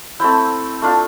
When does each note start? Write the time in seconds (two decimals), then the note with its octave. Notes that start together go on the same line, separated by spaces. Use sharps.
0.19 A3 C4 E4 G5
0.82 A3 D4 F4